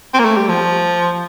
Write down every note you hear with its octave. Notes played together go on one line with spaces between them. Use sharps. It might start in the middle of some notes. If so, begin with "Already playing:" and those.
C4
A#3
A3
G3
F3